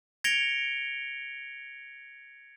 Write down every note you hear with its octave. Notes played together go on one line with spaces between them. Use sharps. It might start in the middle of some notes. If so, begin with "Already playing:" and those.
G#6 A#6 C#7 D7 F7 G7